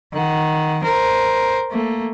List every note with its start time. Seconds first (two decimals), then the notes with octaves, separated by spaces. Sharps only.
0.13 D#3 F#5
0.84 A#4 C5
1.71 A3 A#3